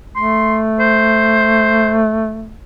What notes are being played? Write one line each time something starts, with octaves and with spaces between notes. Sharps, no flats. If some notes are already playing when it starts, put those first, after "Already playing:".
A3 C6
C5